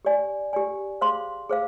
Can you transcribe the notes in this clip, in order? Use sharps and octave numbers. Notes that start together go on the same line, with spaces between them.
G4 D5 G#5
G4 D5 G#5
G#4 C5 F5 C6
G#4 C5 F5